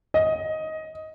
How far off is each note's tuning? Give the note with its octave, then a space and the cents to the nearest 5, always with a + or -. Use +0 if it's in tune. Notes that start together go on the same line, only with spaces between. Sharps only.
D#5 +15